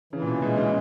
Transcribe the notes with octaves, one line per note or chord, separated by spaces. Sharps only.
C#3 E3
A#2
B2
B2 G#3
C#3